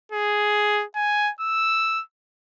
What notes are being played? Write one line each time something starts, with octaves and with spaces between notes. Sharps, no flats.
G#4
G#5
E6